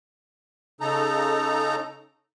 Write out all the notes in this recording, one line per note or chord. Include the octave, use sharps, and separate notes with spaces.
C#3 D#4 A4 A#5